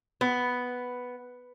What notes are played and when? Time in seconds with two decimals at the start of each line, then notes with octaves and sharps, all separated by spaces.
0.21 B3